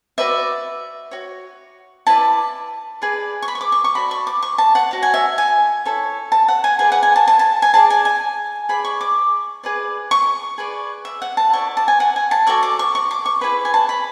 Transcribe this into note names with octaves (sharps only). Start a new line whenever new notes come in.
F#4 B4 D5 E5
F#4 C#5
E4 B4 D5 A5
G#4 B4 D5
C#6
B5
C#6
D6
C#6
C#6
F#4 A4 D5 B5
C#6
D6
C#6
A5
F#5
F#4 C#5
G#5
E5
G#5
E4 A4 C#5
A5
F#5
G#5
G#4 B4 D5 G#5
F#5
G#5
A5
A5
A5
G#5
G#4 D5 A5
G#5
G#5
G#4 D5 B5
C#6
D6
G#4 B4 D5
C#6
G#4 B4 D5
E5
F#5
A5
E4 A4 D5 C#6
A5
G#5
F#5
G#5
A5
F#4 A4 D5 C#6
D6
C#6
C#6
D6
C#6
E4 G#4 B4 B5
G#5
A5
B5